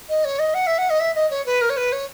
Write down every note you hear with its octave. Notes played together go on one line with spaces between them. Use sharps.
D#5
C#5
D#5
F#5
E5
F#5
D#5
E5
D#5
C#5
B4
A#4
C#5
B4
C#5